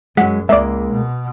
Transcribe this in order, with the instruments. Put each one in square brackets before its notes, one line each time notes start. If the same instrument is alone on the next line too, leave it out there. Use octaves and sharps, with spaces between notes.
[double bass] F#2 [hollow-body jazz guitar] F#3 G#3 [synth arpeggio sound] F#5 B6
[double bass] C#2 [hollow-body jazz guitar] G#3 A#3 [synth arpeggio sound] D5 E5
[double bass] B2